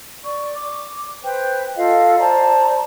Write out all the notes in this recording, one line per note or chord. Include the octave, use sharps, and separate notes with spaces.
D5 C#6
D6
B4 C5 G5
F4 A4 D#5 F5
C5 D5 A5 A#5